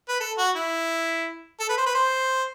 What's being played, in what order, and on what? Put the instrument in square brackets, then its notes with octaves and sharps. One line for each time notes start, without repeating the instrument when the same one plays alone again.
[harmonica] B4
A4
F#4
E4
A4
B4
C5
B4
C5